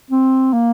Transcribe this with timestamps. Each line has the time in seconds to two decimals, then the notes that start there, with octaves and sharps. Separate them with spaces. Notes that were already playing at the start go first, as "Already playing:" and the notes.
0.11 C4
0.53 A#3